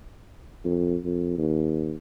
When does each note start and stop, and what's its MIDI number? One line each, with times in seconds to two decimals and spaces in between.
0.65 0.97 41
1.04 1.34 41
1.38 1.94 39